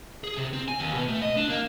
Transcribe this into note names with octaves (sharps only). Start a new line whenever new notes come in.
G#4
C3
C4
G#5
D#2
B2
A3
D#5
D4
A#3